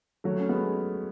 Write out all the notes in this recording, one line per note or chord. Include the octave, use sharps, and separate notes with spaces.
F#3 A3
C#4
G#3 B3